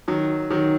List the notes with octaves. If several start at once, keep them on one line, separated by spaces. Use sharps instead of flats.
D#3 F#3
D#3 F#3